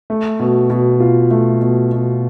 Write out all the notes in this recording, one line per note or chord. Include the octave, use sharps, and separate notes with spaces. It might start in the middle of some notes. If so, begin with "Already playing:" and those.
A3
B2
B2
F4
A3
B2
B2